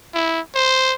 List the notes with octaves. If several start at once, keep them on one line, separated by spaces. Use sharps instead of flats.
E4
C5